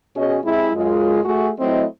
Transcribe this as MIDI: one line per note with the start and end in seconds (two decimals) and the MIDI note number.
0.15 0.38 47
0.15 0.38 61
0.15 0.38 66
0.15 0.38 68
0.15 0.38 73
0.15 0.38 75
0.44 0.69 48
0.44 0.69 56
0.44 0.69 64
0.74 1.21 42
0.74 1.21 56
0.74 1.21 65
1.24 1.49 57
1.24 1.49 66
1.24 1.49 68
1.59 1.84 54
1.59 1.84 57
1.59 1.84 60
1.59 1.84 64
1.59 1.84 75